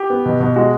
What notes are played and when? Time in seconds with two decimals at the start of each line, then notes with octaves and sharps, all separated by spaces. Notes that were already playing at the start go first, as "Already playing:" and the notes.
Already playing: G4
0.10 B3
0.26 B2
0.40 B2
0.56 G#3 F#4